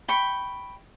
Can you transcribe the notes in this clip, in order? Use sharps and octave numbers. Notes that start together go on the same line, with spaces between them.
G5 B5 C#6